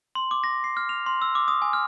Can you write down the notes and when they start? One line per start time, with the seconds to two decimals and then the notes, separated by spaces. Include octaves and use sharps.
0.15 C6
0.31 D6
0.44 A#6
0.64 C7
0.77 F6
0.89 F7
1.06 C6
1.22 E6
1.35 D6
1.48 D#6
1.62 G#5
1.73 F6